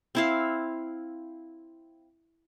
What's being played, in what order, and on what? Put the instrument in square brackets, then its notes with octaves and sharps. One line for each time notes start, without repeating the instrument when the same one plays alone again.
[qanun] C4 E4 F5